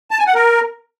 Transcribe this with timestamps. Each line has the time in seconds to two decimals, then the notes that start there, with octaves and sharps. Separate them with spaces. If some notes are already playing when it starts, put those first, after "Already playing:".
0.11 A5
0.19 G#5
0.27 F#5
0.35 A#4